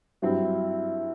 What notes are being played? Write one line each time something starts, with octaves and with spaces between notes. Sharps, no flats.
G2 F#3 C4 E4